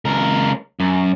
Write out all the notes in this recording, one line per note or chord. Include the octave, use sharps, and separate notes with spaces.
C#2 A#4
F#2